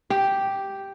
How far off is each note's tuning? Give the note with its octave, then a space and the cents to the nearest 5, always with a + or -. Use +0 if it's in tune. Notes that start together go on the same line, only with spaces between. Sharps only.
G4 +0